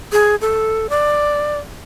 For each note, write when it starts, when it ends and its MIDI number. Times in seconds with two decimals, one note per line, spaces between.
0.12 0.35 68
0.41 0.87 69
0.89 1.58 74